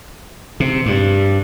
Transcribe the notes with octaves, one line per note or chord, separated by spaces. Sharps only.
C3
G2